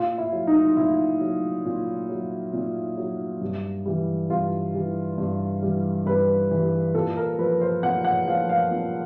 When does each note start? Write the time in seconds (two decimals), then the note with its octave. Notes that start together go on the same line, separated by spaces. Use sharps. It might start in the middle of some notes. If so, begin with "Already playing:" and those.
Already playing: A#2 F4
0.18 E4
0.33 F#3
0.47 D#4
0.77 A#2 E4
1.21 F#3
1.65 A#2
2.09 F#3
2.53 A#2
2.97 F#3
3.41 G2
3.86 E3 G3
4.30 G2 F4
4.74 E3 G3
5.18 G2
5.62 E3 G3
6.06 G2 B4
6.51 E3 G3
6.95 A#2 A4
7.17 A#4
7.39 F3 B4
7.61 C5
7.83 A#2 F#5
8.05 F#5
8.27 F3 F5
8.49 F5
8.71 A#2